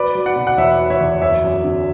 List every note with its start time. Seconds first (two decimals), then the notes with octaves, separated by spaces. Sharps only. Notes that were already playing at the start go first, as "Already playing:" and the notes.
Already playing: F#3 B4 D5
0.15 F#3
0.26 D5 F#5
0.36 B2
0.47 F#5
0.57 E2 C#5 E5
0.79 F#3
0.90 C#5 E5
1.00 E2
1.21 F#2 C#5 E5
1.44 F#2
1.64 D3